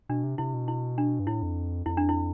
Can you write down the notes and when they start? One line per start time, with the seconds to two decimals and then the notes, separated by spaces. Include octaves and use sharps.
0.09 B2 D4
0.24 C3
0.38 C3 E4
0.54 B2
0.68 E4
0.98 D4
1.20 G2
1.27 A2 E4
1.42 F2
1.86 F2 E4
1.97 D4
2.09 E4